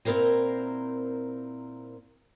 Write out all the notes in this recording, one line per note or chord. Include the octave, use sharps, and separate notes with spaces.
A#2 C4 E4 A#4 C5 A#5